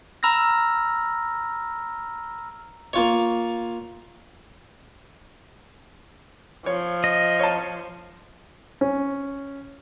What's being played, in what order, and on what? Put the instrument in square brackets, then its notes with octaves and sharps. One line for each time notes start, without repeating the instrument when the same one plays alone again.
[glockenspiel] A#5 B5 E6 F6 A#6
[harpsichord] A#3 F4 C#5
[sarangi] F3 [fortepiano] C#5
[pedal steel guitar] D#5
[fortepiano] C#5 A5
C#4